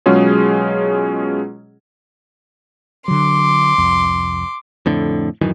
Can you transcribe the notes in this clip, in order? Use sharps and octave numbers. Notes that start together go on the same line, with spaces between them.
B2 F#3 G#3 C#4 F4 G#4
D3 F#3 C6 D6
C2 F2
F2 A2 D3
D1 F#2 D#3 E3